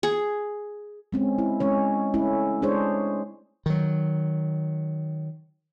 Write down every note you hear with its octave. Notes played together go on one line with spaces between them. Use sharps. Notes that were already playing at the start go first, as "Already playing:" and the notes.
G#4
G#3 C4 C#4
E4
G#3 C#4 C#5
A3 C#4 E4
G#3 D4 G#4 C5 C#5
D#3 F#3